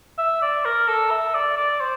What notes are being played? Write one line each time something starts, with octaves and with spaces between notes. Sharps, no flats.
E5
D5
A#4
A4
E5
D5
D5
C5